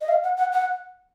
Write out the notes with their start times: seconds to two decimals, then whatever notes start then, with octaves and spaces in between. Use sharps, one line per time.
0.01 D#5
0.08 F5
0.23 F#5
0.37 F#5
0.52 F#5